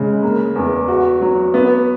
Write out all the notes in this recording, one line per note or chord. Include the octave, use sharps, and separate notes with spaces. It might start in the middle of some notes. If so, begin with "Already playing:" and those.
Already playing: C#3 G#3
A#3
E2
F#4
F#3
B3